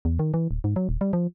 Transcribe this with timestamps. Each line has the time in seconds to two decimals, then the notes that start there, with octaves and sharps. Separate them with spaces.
0.05 E2
0.19 D#3
0.34 E3
0.51 D1
0.64 G#2
0.76 F#3
0.89 D#1
1.01 G3
1.13 F3